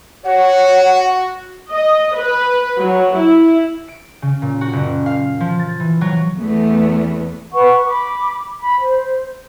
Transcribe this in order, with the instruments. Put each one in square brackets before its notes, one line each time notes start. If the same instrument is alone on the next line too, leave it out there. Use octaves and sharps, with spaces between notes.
[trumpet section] F#4 [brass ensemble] C#5 [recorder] F#5
[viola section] D#5
B4
F#3
E4
[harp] D7
C#3
A#2
F#4
F#1
F5
F3
A6
E3
F#3
[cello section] E2 A3 B3
[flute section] B4 F#5 C#6
B5 D6
B5
C5